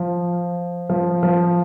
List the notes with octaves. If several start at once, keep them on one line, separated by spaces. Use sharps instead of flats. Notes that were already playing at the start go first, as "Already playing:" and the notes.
Already playing: F3
F3
F3